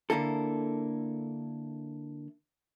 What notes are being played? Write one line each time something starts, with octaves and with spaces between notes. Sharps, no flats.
D3 A#3 E4 A4